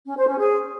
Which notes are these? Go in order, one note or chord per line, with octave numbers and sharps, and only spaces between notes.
C#4
C5
C#4
G#4